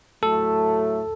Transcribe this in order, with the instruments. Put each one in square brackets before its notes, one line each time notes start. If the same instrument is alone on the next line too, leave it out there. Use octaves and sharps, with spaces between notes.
[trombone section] A2 F#3 A3 [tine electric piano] A4